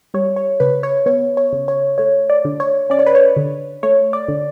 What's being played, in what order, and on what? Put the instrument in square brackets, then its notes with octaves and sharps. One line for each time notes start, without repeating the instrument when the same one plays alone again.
[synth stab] G3 C#5
C#5
C#3 B4
C#5
B3 C#5
C#5
C#3
C#5
A3 C#5
D5
D3
C#5
C#4 D5
C#5
B4
C#5
D3
A3 C#5
D5
D3